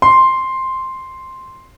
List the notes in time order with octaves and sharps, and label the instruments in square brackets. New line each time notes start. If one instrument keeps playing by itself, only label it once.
[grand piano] C6